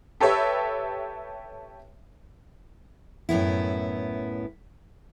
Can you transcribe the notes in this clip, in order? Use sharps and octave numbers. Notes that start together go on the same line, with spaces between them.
G4 A4 B4 C#5 E5
F#2 A2 B3 E4